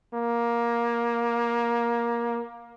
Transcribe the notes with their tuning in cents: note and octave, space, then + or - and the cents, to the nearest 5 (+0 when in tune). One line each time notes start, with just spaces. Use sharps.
A#3 +15